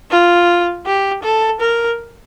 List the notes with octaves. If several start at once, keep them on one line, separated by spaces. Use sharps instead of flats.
F4
G4
A4
A#4